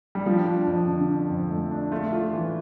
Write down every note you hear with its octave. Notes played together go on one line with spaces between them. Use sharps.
G3
F3 D4
D4
F2
D3
D4
F2
A3
D4
A3 F4
F4
E3